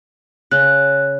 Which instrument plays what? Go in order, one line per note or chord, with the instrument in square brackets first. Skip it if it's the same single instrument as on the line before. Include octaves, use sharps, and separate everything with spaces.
[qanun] C#3 [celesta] F#6